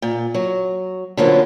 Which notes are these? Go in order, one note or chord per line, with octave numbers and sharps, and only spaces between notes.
A#2
F#3
D3 F3 F#3 A#3 B3 C#4